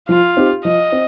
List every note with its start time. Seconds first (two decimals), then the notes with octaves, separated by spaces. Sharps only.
0.09 F3 F4
0.37 C4 D#4 G4
0.64 F3 D#5
0.92 C4